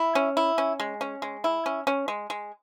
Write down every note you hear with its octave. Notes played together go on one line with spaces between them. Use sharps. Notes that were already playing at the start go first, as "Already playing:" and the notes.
Already playing: E4
C#4
E4
C#4
G#3
C#4
G#3
E4
C#4
C#4
G#3
G#3